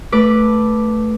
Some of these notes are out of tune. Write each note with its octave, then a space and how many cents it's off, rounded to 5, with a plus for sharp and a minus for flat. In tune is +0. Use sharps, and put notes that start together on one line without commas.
A3 +0 B4 -15 D6 +0